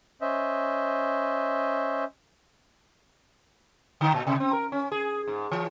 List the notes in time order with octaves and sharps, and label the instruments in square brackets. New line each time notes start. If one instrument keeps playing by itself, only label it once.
[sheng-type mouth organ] C#4 C5 D#5 E5
[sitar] D3
A#2
C3
C4
A#4
C#4
G#4
G#2
E3